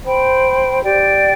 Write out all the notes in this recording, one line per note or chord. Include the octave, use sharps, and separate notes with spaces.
C5 G5 B5
G4 D5 G5